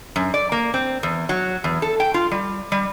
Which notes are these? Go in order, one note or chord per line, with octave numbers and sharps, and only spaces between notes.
F#2
D5
A#3
C4
E2
F#3
E2
A4
G5
F4
G3
G3